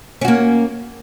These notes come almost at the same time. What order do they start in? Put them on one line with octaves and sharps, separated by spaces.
C#4 F#4 A#3